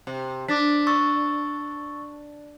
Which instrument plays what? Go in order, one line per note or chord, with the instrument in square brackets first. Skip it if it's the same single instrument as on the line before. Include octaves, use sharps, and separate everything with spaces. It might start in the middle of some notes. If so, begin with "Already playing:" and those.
[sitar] C3
[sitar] D4 [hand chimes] D6 A6 B6
[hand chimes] C#6 E6 A6